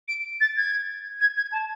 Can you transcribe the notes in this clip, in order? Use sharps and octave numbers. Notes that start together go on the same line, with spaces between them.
D7
A6
G#6
G#6
G#6
A5